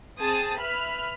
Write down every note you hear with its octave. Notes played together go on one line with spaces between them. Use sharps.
C4 G#4 A5 D#6
B4 E5 B5 F6